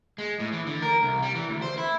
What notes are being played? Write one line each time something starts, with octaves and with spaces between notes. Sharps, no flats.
G#3
A2
E3
D3
A#4
C2
G3
E3
D2
C5
E4